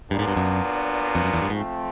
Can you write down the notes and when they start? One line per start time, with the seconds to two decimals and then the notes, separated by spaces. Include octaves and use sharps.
0.10 G2 A#2 F#3 B3 D4
0.19 G#2
0.28 G2
0.36 F#2
1.15 F2
1.24 F#2
1.34 E2
1.42 G2
1.50 G#2 F3 A3 C4